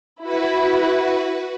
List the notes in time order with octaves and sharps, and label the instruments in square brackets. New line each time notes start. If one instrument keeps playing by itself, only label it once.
[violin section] E4 [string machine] F#4 B4